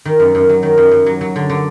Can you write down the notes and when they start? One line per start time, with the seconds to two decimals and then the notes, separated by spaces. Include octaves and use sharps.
0.05 D#3
0.20 F#2
0.35 F#2
0.49 F#3
0.63 D#3
0.78 F#2
0.91 F#2
1.06 F#3
1.21 F#3
1.36 D3
1.50 D3